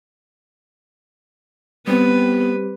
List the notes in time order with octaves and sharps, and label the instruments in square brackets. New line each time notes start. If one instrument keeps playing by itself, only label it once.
[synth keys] G3 C4 G4 [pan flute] B3 [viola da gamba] B4